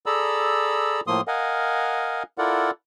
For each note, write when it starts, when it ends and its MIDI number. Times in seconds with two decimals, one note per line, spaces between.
0.06 1.01 68
0.06 1.01 69
0.06 1.01 74
0.06 1.01 82
0.06 1.01 83
0.06 1.01 88
1.07 1.21 45
1.07 1.21 53
1.07 1.21 58
1.07 1.21 84
1.07 1.21 87
1.28 2.23 70
1.28 2.23 75
1.28 2.23 77
1.28 2.23 78
1.28 2.23 80
2.38 2.71 64
2.38 2.71 65
2.38 2.71 69
2.38 2.71 70
2.38 2.71 74
2.38 2.71 78